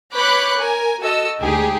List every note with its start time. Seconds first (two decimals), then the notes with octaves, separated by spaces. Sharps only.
0.13 B4 C#5 B5 D6 F#6 G6
0.57 A#4 G#5
1.00 F#4 A4 D#5 E6
1.40 D2 G#3 D#4 G4 G#4